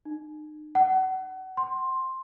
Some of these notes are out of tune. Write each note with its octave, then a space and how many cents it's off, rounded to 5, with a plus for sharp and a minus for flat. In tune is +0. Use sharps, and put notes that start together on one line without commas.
D#4 -35
F#5 +30
C6 +10